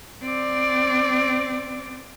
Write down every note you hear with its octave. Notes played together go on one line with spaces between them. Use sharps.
C4 D5